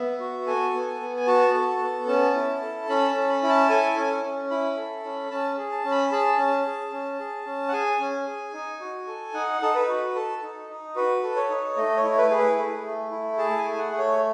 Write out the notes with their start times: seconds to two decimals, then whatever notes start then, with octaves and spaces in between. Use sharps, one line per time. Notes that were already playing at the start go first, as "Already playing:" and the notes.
Already playing: B3 E5
0.20 F#4
0.47 A4 G#5
0.73 B3
1.00 B3
1.16 G#5
1.27 F#4 A5
1.54 A4
1.82 B3
2.08 C#4 A5
2.35 E4
2.62 A4
2.89 C#4 B5
3.09 A5
3.15 C#4
3.29 B5
3.43 E4
3.49 A5
3.69 A4 G#5
3.97 C#4
4.23 C#4
4.50 E4 B5
4.77 A4
5.04 C#4
5.31 C#4 A5
5.58 G#4
5.71 A5
5.84 C#4
5.91 B5
6.12 G#4 A5
6.38 C#4
6.66 G#4
6.93 C#4
7.19 G#4
7.46 C#4
7.68 F#5
7.73 G#4 G#5
8.00 C#4
8.27 G#4
8.54 D#4
8.80 F#4
9.07 A4
9.34 D#4 F#5
9.61 D#4 A4
9.75 B4
9.88 F#4
10.15 A4
10.43 D#4
10.69 D#4
10.96 F#4 B4
11.23 A4
11.36 C#5
11.49 D#4
11.76 A3 D#5
11.97 C#5
12.03 E4
12.18 B4
12.31 G#4
12.37 B4
12.58 A3
12.84 A3
13.11 E4
13.38 G#4 A5
13.58 G#5
13.65 A3
13.78 F#5
13.92 A3
13.98 C#5